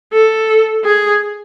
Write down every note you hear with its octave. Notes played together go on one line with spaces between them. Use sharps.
A4
G#4